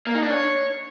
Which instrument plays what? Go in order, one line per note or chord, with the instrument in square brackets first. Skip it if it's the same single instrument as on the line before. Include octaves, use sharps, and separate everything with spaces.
[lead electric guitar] A#3
D#4
D4
C#5